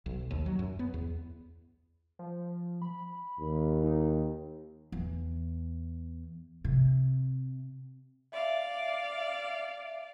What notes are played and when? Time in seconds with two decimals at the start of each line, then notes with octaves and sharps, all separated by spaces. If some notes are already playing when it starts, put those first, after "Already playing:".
0.06 B1
0.31 D#2
0.46 F#3
0.59 F#2
0.79 B3
0.94 E2
2.19 F3
2.82 B5
3.39 D#2
3.84 D#4
4.92 E2
6.64 C3
8.32 D5 E5 F5